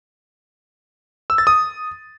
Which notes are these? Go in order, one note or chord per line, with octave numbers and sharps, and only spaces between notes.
E6
A6
D#6